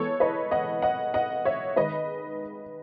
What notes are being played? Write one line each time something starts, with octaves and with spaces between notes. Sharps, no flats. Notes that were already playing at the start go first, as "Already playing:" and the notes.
Already playing: E3 G#3 B3 A4 C#5
B4 D#5
D#5 F#5
D#5 F#5
D#5 F#5
C#5 E5
D#3 G#3 D#4 B4 D#5